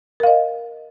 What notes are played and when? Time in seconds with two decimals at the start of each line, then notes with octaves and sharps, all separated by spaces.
0.20 A#4
0.23 F5
0.27 D#5